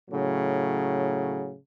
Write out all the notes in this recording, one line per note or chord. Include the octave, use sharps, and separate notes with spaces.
A2 C#3 F#3